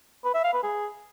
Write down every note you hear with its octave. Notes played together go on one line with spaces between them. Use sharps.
B4
E5
F5
B4
G#4